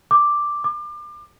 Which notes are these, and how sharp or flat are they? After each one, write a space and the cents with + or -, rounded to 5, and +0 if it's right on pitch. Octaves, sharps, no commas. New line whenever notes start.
D6 +0
D6 +30